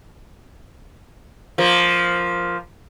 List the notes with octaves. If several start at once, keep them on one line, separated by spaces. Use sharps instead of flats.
F3 A#3